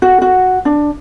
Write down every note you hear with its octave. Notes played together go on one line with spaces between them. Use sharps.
F#4
F#4
D4